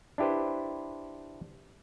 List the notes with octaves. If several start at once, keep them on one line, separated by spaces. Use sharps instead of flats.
D4 E4 G4 B4 C5